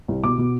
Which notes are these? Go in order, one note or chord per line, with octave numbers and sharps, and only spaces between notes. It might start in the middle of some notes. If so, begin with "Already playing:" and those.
C2
B2 D6
B2